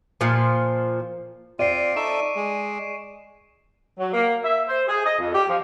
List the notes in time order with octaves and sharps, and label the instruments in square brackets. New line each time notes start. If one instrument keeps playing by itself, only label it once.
[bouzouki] A#2 F3
[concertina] C4 F4 [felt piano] D5 [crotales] C7 D7 D#7
[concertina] D#4 A4 E5 [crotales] C#6 E7
[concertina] G#3
[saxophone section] F#3
A#3
E5
C5
G#4
D#5
F2
G4
F3